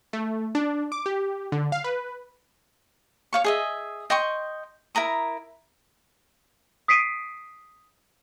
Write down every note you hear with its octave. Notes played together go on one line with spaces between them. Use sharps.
A3
D4
D6
G4
D3
F5
B4
C#5 F5 C#6
G#4 D#5 E5
D#5 G5 C6 C#6
E4 A#4 A#5 D#6
D#6 B6 C7 D7 D#7